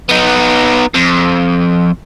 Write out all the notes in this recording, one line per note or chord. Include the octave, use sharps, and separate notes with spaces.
B3 D#4
F2